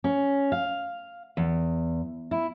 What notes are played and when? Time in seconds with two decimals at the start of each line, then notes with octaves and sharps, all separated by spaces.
0.04 C#4
0.52 F5
1.37 E2
2.31 E4